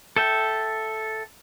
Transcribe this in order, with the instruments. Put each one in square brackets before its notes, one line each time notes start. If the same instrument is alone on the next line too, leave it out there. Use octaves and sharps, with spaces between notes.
[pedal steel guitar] A4 E5 G5